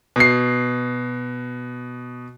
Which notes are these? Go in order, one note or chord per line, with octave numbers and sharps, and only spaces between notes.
B2 C7